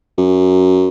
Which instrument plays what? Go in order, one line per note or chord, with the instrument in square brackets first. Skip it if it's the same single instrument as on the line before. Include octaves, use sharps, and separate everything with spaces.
[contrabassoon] F#2